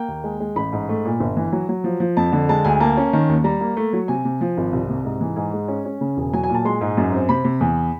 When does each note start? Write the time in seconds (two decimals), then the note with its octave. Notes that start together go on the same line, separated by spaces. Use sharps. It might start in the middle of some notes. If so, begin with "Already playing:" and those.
Already playing: A#3 G5
0.08 D#2
0.24 G#3
0.40 G#3
0.56 A1 B5
0.73 G#2
0.89 A3
1.05 A#2
1.20 G1
1.37 E3
1.53 F#3
1.69 F#3
1.84 F3
2.00 F3
2.17 F2 A5
2.32 D3
2.49 G#3 A5
2.65 D2 G#5
2.80 A#3 A5
2.97 C#4
3.13 D#3
3.29 D#2
3.44 G3 A#5
3.61 A#3
3.77 A3
3.93 F#3
4.08 C3 G#5
4.25 C3
4.41 F3
4.57 G#1
4.73 C2
4.89 C3
5.05 G#2
5.21 E3
5.36 G#2 G#5
5.53 G#3
5.68 C#4
5.85 C#4
6.01 C#3
6.17 E1
6.33 F#3 G#5
6.44 G#5
6.49 A#2
6.54 A5
6.65 G#3 C6
6.81 G#2
6.97 F#2
7.12 C4
7.29 C3 B5
7.44 C3
7.61 E2